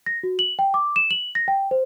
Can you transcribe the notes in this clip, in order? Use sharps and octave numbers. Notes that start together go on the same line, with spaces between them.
A#6
F#4
F#7
G5
D6
E7
F#7
A#6
G5
C5